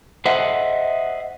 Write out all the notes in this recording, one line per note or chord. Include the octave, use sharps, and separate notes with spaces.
C5 D#5 E5 F#5